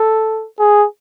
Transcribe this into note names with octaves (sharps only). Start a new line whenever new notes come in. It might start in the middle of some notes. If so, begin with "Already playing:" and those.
Already playing: A4
G#4